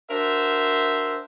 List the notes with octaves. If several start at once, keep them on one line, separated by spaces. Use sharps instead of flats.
D4 F#4 A#4 C5 E5